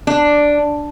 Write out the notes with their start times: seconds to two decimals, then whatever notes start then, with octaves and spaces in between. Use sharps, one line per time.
0.07 D4